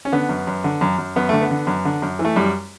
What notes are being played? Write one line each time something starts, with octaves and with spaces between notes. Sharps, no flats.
C#4
D3 B3
F#2
F#2
D3
F#2
F#2
F#2 B3
D3 A3
B3
D3
F#2
D3
F#2
E3
A3
F#2 G3